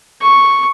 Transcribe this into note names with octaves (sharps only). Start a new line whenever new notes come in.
C#6